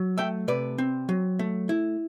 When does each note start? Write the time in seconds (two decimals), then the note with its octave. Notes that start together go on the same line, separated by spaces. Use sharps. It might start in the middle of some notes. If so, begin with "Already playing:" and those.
Already playing: F#3
0.18 A3 E5 G5
0.48 C3 B4 D5
0.78 C4
1.09 F#3
1.39 A3
1.69 E4